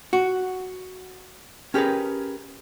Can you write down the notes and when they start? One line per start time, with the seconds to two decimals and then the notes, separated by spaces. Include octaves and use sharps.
0.13 F#4
1.74 C#4 G4 G#4 A#4 B4